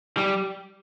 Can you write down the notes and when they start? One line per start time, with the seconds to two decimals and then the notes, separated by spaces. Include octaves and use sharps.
0.17 G3